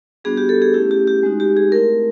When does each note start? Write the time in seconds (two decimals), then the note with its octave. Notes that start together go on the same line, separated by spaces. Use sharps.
0.24 G3 B3 D4 F#4 G#4
0.37 G4
0.49 A4
0.62 G#4
0.74 A3 C#4 E4 G4
0.91 G4
1.07 G4
1.23 G#3 C4 D#4 F#4
1.40 G4
1.57 G#4
1.72 A3 C4 E4 A#4